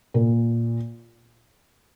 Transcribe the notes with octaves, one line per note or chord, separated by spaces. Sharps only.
A#2